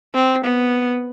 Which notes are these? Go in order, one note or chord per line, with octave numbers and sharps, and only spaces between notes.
C4
B3